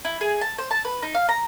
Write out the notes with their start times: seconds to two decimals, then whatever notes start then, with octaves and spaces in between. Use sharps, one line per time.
0.05 E4
0.21 G#4
0.41 A5
0.58 C5
0.71 A5
0.85 B4
1.02 D#4
1.15 F5
1.29 A#5